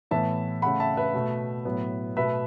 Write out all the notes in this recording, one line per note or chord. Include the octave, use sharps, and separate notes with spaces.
A2 E3 B3 E5 A5
C#3 A3 F#5 B5
E5 A5
B4 E5
B2 A3
A2 F#3 B3
B2 A3 B4 E5